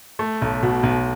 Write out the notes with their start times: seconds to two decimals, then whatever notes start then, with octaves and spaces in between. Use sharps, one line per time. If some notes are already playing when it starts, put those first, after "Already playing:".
0.19 A3
0.42 B1
0.62 B2
0.83 B1